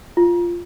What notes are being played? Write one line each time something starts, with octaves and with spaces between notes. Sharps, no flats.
F4